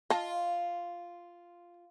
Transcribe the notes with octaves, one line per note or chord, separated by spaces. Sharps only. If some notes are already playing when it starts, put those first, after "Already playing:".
F4 D#5 A5